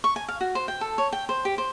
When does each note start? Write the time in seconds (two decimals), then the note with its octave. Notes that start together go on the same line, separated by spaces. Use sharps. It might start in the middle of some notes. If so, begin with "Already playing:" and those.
0.04 C#6
0.16 G#5
0.29 F5
0.41 F#4
0.55 C5
0.68 G5
0.81 A4
0.98 C#5
1.13 G5
1.29 C5
1.45 G4
1.58 C5